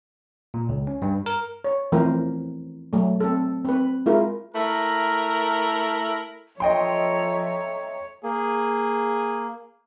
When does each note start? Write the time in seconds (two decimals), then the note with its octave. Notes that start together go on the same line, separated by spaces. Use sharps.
0.54 A#2
0.69 C#2
0.87 C#4
1.02 G2
1.26 A#4
1.64 C#5
1.92 E3 F3 A3 C4 A#4 C5
2.93 F#3 A3
3.20 C4 A4
3.65 C4 B4
4.06 G#3 E4 F4 A#4
4.55 A3 E4 A#4
6.60 F3 A4 C#5 D#5 E5 G5 A#5 C6
8.23 A#3 G#4